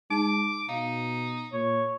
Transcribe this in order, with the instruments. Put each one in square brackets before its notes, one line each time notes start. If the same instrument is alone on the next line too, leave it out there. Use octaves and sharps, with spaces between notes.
[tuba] G#3 [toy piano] D#4 A5 [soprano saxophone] D6
[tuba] B2 [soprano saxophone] D#4 [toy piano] F5
[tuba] A#2 [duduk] C#5